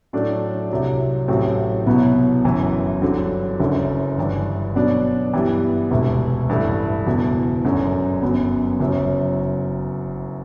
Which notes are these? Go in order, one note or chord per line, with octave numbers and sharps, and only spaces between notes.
A2 F#3 A3 D4
C2 C3 F#3
A1 A2 F#3 C4 G4
C2 B2 F#3 B3
G1 F#2 E3
G1 G2 D3 F#3 C4
F#1 F#2 D3
G1 G2 E3
B2 F#3 B3 D4
G2 E3 B3 E4 G4
E1 D2 C3
A1 G2 E3 A3 E4
F#1 E2 B2
G1 F#2 D3
G1 F#2 F#3 B3
F#1 F#2 F#3